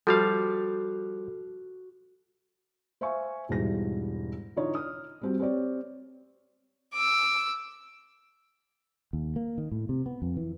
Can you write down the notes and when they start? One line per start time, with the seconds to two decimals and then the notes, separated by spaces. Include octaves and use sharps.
0.07 F3 G3 F#4 A4 F5
3.01 C5 E5 F5 G#5 C#6
3.49 E1 G#2 E3 G3 A#6
4.56 D3 E3 D#4 F4 C#5
4.75 D#6 F6
5.22 G3 C4 F#4
5.39 C4 G4 C#5 D5
6.94 D6 E6
9.13 D#2
9.36 A#3
9.58 D#3
9.71 A2
9.89 C3
10.06 B3
10.22 F2
10.37 E3